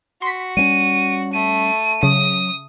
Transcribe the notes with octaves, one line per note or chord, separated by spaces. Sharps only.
F#4 C6 B6
G3 B3 C#4 D#7
A3 D#7
C#3 F#3 D#6